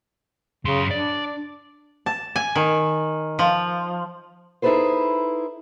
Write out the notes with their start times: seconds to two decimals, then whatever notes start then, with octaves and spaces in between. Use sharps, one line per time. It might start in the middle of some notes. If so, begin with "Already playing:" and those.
0.65 F#2 C#3 C6
0.91 D4 D5
2.06 A5
2.36 G#5
2.55 D#3
3.39 F3
4.62 D#4 E4 G#4 A4 B4 C5